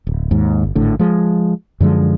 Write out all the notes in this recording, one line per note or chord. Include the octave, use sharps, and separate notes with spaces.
D1
D#2 G#2
G1
G#1 A2 D3
F3 G#3
F#2 D3 F3 G#3